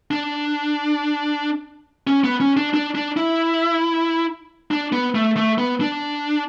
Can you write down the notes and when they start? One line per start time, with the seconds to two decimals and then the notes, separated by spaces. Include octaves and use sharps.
0.11 D4
2.07 C#4
2.24 B3
2.40 C#4
2.57 D4
2.74 D4
2.95 D4
3.17 E4
4.71 D4
4.93 B3
5.15 A3
5.37 A3
5.58 B3
5.81 D4